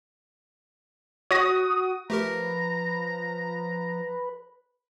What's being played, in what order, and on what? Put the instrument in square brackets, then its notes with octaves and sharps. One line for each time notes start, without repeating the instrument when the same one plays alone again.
[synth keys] F#4 D#6 [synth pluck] C#5 A#6
[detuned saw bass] F3 [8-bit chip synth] A3 G4 A#4 [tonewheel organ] B4 [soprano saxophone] A#5